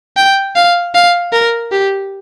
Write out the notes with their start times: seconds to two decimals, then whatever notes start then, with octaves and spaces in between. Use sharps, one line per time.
0.17 G5
0.56 F5
0.95 F5
1.32 A#4
1.72 G4